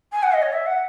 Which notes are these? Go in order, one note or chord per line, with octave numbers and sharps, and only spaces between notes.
G#5
F#5
D#5
C#5
E5
F#5